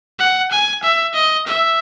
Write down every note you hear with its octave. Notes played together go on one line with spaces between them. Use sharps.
F#5
G#5
E5
D#5
E5